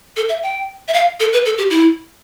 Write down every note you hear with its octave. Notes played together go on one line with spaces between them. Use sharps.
A4
E5
G5
E5
F5
A4
B4
A4
G4
E4